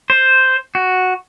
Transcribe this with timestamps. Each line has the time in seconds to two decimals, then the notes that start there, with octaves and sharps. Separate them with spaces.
0.10 C5
0.75 F#4